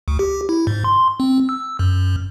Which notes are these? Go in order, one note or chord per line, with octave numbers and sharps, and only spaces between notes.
D2
G4
E4
G#2
C6
C4
E6
F#2